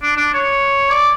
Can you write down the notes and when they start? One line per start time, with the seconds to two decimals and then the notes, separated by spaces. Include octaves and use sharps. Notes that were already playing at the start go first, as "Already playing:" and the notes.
0.02 D4
0.16 D4
0.34 C#5
0.90 D5